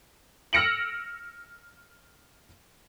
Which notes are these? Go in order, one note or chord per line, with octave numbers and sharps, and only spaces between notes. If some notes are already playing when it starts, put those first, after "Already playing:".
E6 F6 A#6 C#7 D7 F#7